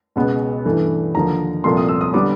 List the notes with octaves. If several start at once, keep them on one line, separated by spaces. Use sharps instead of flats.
C#2 B2 G#3 B3
G2 E3 A3
D#2 D3 F3 A#5
C2 A#2 F3 A3 C6
D#6
E6
D#6
D3 G3 B3 D6